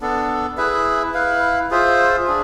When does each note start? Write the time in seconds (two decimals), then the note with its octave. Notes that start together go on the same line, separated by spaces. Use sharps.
0.01 B3 D4 A4
0.57 E4 G#4 B4 E5
1.14 E4 B4 F5
1.71 F4 G#4 C5 E5
2.27 D4 G#4